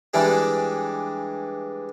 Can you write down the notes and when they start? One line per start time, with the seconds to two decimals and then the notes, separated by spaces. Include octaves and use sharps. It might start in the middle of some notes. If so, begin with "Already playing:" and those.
0.14 E3 G3 G#3 D4